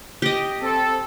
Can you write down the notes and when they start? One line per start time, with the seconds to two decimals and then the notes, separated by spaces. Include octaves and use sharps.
0.22 G4 D#5
0.62 C4 A4